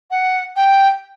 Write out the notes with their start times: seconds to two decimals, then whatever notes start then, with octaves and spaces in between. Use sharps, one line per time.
0.11 F#5
0.56 G5